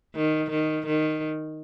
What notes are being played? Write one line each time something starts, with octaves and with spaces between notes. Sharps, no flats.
D#3
D#3
D#3